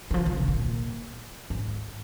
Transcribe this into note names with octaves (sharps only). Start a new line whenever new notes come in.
D#3
F3
D#3
C3
A#2
G#2